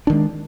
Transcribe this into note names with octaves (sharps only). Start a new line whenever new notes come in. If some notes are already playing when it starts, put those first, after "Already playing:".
D#3 G#3 D4